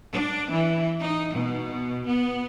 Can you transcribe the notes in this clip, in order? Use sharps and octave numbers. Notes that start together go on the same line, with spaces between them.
D4
E3
D#4
B2
B3